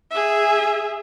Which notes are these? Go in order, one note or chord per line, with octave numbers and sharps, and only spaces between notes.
G#4 E5